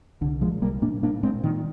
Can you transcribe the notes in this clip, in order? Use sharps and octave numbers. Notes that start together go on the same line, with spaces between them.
C2 D3
A#2 F3 G#3
C2 G3 A#3
A#2 A#3 D4
A#2 A#3 D4
A#2 G#3 C4
A#2 D#3